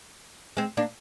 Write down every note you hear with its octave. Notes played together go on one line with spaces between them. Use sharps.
G#3 C4
A#3 D4